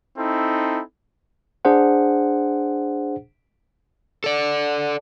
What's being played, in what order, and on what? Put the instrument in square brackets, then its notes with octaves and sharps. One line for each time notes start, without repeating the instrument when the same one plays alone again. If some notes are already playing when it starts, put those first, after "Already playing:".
[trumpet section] C4 D#4 E4 A4
[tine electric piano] D4 G#4 C5 F#5
[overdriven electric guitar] A4 D5